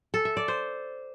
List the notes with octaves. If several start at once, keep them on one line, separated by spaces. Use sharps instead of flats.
A4
E5
D5
C5